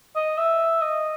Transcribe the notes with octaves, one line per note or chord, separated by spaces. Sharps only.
D#5
E5
D#5